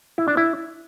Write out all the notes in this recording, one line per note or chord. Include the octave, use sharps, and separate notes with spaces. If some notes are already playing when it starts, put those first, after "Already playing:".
E4
D4
E4